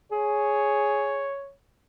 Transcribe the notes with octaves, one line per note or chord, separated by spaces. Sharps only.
G#4 C#5